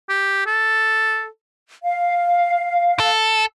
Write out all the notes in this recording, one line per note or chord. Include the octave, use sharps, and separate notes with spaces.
G4
A4
F5
A4